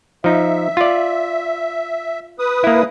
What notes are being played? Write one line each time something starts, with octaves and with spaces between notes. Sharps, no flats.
F3 D#4 E5
F4 D5
B4 D#6
A#3 E4